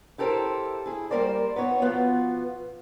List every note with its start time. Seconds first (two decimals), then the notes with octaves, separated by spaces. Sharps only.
0.18 E4 G4 A4 A#4 C5
0.86 E4 G#4
1.11 G3 A#3 A#4 C5 D5
1.56 B3 D#4 C#5
1.82 B2 F3 B3 F4